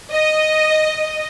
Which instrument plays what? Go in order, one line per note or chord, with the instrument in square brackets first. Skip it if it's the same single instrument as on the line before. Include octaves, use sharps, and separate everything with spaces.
[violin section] D#5